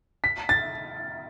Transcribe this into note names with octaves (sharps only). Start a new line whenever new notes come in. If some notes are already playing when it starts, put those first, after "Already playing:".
B6
A6